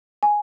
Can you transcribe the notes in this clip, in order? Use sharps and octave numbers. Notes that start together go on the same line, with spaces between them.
G#5